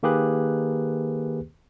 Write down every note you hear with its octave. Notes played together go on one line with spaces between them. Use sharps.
D#3 A#3 G4 G#4 B4 F#6